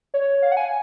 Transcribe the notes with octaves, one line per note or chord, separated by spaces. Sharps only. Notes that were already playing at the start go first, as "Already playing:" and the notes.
C#5
F5
F#5
G#5